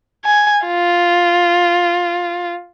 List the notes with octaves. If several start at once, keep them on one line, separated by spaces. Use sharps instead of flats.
G#5
F4